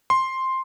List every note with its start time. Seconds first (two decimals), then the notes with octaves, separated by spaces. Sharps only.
0.10 C6